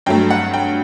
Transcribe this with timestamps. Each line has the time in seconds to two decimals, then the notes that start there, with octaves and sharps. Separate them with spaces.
0.06 G2 F#3 A3 G5
0.30 F#5
0.54 G5